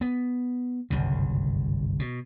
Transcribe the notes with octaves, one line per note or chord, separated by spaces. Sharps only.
B3
G1 C2 F#2 C#3
B2